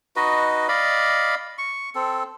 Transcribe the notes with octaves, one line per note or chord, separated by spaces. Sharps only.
D#4 F#4 B4 D#5
D5 D#5 F5 B5
C#6
C4 A4